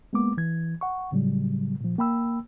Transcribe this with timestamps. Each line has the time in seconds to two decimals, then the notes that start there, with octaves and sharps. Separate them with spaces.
0.13 G#3 A#3 B3 D6
0.37 E3 G#6
0.81 F#5 C#6
1.12 A2 C#3 F#3 G3
1.81 A#2 F3
1.98 A#3 G5 B5 E6